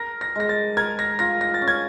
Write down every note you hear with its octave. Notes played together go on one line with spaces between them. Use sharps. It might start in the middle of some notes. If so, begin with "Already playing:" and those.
Already playing: A#4 A#6
A#6
G#3 A#6
A6
A#4 G#6
A#6
F4 A#6
A#6
A6
C#4
G#6